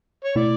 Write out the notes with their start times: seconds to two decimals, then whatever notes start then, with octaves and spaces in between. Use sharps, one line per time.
0.24 C#5
0.36 B2 A3 E4 D5